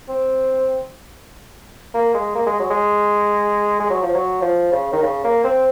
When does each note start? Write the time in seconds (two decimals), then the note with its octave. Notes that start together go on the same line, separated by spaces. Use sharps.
0.08 C4
1.94 A#3
2.14 G#3
2.35 A#3
2.46 G#3
2.59 F#3
2.70 G#3
3.80 G#3
3.90 F#3
4.03 F3
4.14 F#3
4.42 F3
4.72 C#3
4.93 D#3
5.02 C#3
5.24 A#3
5.44 C4